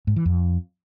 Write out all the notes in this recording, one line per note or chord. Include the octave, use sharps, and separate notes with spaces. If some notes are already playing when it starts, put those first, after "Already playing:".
G#2
E3
F2